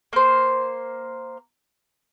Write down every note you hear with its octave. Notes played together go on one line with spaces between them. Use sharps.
A#3 C5